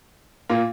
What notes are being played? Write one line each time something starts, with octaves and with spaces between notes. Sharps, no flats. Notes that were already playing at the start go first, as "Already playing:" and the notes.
A#2 A#3